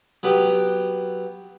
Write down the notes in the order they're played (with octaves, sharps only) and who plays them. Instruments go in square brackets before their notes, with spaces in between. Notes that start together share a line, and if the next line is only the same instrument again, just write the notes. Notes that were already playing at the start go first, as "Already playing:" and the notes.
[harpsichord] F#3 B3 G4